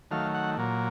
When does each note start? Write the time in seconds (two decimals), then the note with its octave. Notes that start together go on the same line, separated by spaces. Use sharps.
0.11 D#3 F#3 A3 F5
0.34 F#5
0.57 A#2 F#3 A#3